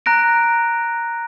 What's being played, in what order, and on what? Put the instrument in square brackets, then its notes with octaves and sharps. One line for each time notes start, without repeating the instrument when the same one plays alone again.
[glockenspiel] A#5 F#6 A#6 D7